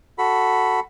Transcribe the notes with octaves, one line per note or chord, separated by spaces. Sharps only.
F#4 A4 B5